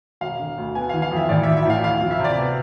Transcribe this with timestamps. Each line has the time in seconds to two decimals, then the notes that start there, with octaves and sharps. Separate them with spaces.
0.21 E1 F5
0.39 D3
0.58 D2
0.75 B3 G#5
0.89 F5
0.94 E3
1.02 F5
1.12 F2 E5
1.29 A1 D5
1.43 E3 E5
1.57 E5
1.65 A2 F5
1.84 D2 F5
2.01 F3
2.11 E5
2.20 C3 D5
2.38 B3